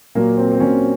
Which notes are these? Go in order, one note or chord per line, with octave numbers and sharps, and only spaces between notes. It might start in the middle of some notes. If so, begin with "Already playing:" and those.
A#2 F#3 A#3
C4
C4
A#2 F#3 C#4